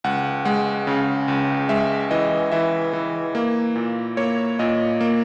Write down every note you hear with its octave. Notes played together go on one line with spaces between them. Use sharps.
C#2 F#5
G#3 F#5
C#3
C#2
G#3 E5
E3 D#5
E3 E5
E3
A#3
A#2
A#3 C#5
A#2 D#5
A#3